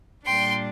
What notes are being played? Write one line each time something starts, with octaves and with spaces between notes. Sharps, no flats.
A#2 G3 D4 G5 C6